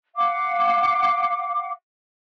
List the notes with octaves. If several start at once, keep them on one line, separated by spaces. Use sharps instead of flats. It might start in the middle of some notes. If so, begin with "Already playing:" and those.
F5 F#5 D6